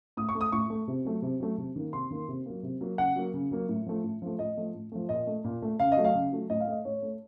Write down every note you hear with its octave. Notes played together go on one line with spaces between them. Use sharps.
A2 D#6
C#6
A3
D#6
A2 C#6
A3
C3
F#3 A3
C3
F#3 A3
C3
D#3 A#3
C3 C6
D#3 A#3
C3
F#3 A#3
C3
F#3 A#3
C#3 F#5
F#3 A#3
C#3
F#3 A#3
A2
F3 A3
A2
F3 A3
A2 D#5
F3 A3
A2
F3 A3
A#2 D#5
A3
A#2
A3
C#3 F5
D#5
F#3 A3
F5
C#3
F#3 A3
A2 D#5
F5
A3 D#5
A2 C#5
A3